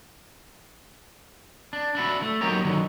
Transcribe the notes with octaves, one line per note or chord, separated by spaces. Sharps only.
D4
D4 E4 F#4
A3
F#3 A#3 D#4 G4 A#4 C#5
D3 D#3 F#3